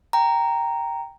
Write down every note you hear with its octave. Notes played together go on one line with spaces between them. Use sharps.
G5 A#5